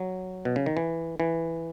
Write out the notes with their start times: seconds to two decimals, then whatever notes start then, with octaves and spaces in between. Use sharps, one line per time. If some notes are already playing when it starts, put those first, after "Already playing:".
Already playing: F#3
0.45 B2
0.56 C#3
0.66 D#3
0.77 E3
1.20 E3